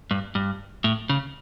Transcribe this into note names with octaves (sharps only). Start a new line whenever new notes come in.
G2
G2
A2
C#3